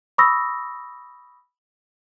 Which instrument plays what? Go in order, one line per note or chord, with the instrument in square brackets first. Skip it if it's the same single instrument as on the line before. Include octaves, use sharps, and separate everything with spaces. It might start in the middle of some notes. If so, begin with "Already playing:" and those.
[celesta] B5 C#6 D#6 E6 A#6